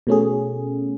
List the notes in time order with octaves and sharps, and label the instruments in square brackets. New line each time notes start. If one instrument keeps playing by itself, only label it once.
[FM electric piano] B2 A3 C#4 G#4